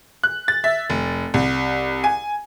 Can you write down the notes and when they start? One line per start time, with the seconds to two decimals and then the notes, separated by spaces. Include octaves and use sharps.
0.24 F#6
0.48 A6
0.64 E5
0.90 F1
1.34 C2
2.04 G#5